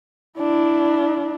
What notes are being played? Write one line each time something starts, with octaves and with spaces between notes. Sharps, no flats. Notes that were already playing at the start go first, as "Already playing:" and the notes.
D4 E4